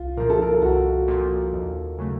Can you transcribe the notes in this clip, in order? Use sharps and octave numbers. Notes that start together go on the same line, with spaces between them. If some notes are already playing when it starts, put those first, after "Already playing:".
Already playing: C2 F4
A#2 F3 A#4
A4
A#4
A4
C2 F#4
A#2 F3
D#2
C#3 F#3 A3